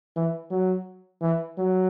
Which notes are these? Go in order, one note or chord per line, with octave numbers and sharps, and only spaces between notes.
E3
F#3
E3
F#3